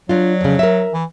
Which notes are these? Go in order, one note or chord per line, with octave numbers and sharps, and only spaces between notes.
F#3 D4 F4
F2 C#3
A#4 E5
E3